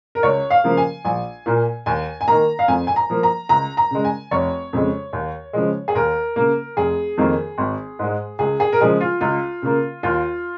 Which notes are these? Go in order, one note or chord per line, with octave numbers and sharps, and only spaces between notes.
A#4
C#2 C#5
F5
C#3 F3 A#3
G#5
A#1 G#5
A#2 A#3
D#2 G#5
G#5
D#3 A#3 A#5
F5
F2 G#5
G#5
A#5
F3 A#3
A#5
C#2 A#5
A#5
C#3 G#3
G#5
F1 C#5
F2 C#3 G#3
D#2
C#3 F3 G#3
G#4
D#2 A#4
C#3 A#3
F1 G#4
F2 D#3 A#3
G#1
G#2 G#3
C#2 G#4
G#4
A#4
C#3 F3 G#3 G#4
F4
C#2 F4
C#3 A#3
D#2 F4